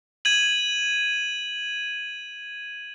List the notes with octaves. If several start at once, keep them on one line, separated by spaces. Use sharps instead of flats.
G#6 D#7 F#7